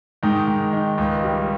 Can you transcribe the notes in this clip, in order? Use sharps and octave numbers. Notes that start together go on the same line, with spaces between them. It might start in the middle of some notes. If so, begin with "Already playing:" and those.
G#2 D#3 D#4
G#2
D#3
C#2
G3